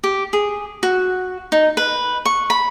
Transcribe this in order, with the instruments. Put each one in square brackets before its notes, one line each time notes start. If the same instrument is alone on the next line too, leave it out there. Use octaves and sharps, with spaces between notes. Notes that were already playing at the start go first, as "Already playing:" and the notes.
[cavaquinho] G4
G#4
F#4
D#4
B4
C#6
B5